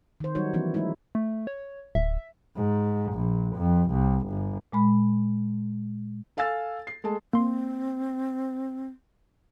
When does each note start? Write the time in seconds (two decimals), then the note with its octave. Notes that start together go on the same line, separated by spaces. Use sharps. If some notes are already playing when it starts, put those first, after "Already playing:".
0.20 D#3 C5
0.35 F#3 G3 D#4 F#4 C#5
0.54 E3 F3 B3 C#4 E4
0.74 F#3 G#3 A3 D#4 E4
1.15 A3
1.47 C#5
1.95 D1 E5
2.56 G#2
3.13 A#1
3.57 F2
3.91 C2
4.27 G1
4.72 A#2 G#3 B5
6.37 A4 F5 G#5 E6 A6
6.87 C7
7.04 G#3 A3 A5
7.33 A#3 C4 C6